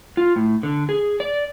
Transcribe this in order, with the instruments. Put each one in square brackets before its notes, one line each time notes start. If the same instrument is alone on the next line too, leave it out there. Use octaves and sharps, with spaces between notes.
[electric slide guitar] F4
A2
D3
G#4
D5